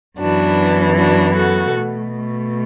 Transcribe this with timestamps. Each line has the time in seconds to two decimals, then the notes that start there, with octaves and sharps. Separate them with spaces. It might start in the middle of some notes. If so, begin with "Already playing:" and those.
0.19 F#2 E3 B3 D4 F#4
0.96 D4 F#4
1.35 F#4 A4
1.74 B2 A3